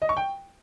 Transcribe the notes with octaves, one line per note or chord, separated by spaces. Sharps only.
D#5
C#6
G5